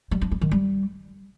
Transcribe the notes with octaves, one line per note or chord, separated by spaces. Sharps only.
G3
D4
G3
D#3
G3